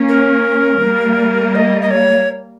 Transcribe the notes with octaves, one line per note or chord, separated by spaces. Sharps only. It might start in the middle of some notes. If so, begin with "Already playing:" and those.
Already playing: A#3 C#4
A#4
G3 A#3
D#5
D#5
C#5